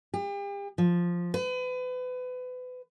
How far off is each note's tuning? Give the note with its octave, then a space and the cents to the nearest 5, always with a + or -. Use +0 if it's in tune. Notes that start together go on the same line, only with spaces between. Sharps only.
G4 +40
F3 +0
B4 +30